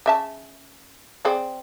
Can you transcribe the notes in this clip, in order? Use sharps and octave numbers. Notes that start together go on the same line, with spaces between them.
C#3 E5 A5
C4 G#4 D5